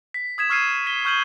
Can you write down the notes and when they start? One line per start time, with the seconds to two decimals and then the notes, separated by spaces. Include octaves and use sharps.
0.14 B6
0.38 D#6 G#6 B6 E7
0.50 C#6 E6 F6 G#6 C7 D#7
0.87 B6 G7
1.05 C#6 F6 G6 D#7 F#7 G7